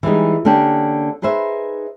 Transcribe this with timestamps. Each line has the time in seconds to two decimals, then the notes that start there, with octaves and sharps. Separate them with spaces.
0.03 E3 G3 G#3 D#4
0.45 D3 A#3 C#4 D4 G4
1.22 D#4 G#4 B4 C5 E5